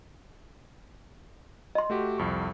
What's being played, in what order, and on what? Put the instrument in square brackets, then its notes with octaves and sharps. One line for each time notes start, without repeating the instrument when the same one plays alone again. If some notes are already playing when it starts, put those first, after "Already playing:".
[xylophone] D#5 C6
[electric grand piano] A3 F#4 G4
C2 F2 C#6